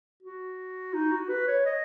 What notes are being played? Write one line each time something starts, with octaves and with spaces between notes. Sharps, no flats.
F#4
D#4
F#4
B4
C#5
D#5